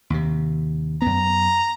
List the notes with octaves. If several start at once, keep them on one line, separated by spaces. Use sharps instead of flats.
D#2 C3
F#2 B3 A#5